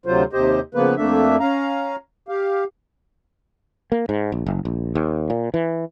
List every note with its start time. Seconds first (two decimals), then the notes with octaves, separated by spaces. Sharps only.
0.06 D2 C3 F#3 F4 C5
0.33 D#2 C3 G4 C5 D#5
0.75 C#3 F3 A#3 B3 B4
0.97 F2 A3 A#3 D4 E5
1.40 C#4 F5 A#5
2.29 G4 F5
3.92 A#3
4.09 G#2
4.32 A#1
4.46 F#1
4.65 A#1
4.95 D#2
5.30 A#2
5.54 E3